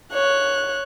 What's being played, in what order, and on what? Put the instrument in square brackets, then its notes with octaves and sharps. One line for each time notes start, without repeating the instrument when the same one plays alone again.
[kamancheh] C#5 F#6